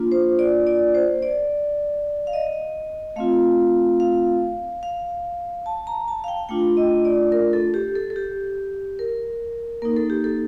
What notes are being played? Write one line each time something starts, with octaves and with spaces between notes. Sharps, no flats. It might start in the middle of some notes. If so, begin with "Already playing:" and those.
Already playing: A#3 D4 F4
C5
D5
D5
C5
D5
F5
D#5
A3 C4 F4 F5
F5
F5
A5
A#5
A5
F5
G5
A3 D4 F4 G5
D#5
D5
A#4
A4
G4
A4
A4
G4
A#4
A#3 D#4 A#4
A4
G4
A4